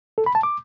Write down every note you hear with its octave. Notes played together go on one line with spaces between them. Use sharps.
A4
B5
A5
D6